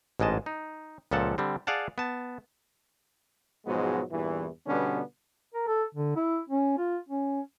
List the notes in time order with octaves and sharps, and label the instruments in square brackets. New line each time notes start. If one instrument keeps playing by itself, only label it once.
[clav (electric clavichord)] A1 G#2 G#3 D#5 A5
D#4
C#2 A#2 F3 A4 F#5 A5
D3 G3 C4
G#4 D5 F5 F#5 A5
B3 A5
[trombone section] G#2 B2 F3 F#3 G#3 B3
E2 G2 A#2 E3
B2 D3 G3 B3 C#4 D4
[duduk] A#4
A4
D3
E4
C#4
F4
C#4